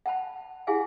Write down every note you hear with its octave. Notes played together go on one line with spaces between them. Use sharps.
F#5 G5 A5 B5
E4 G4 G#4 F5 F#5 G#5